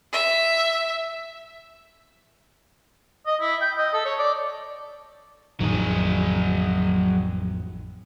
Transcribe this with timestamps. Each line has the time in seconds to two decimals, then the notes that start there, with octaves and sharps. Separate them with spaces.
0.13 E5
3.26 D#5
3.40 E4
3.61 G5
3.78 D#5
3.93 A4
4.05 C#5
4.19 D5
5.60 A1 F2 D#3 F#3 G#4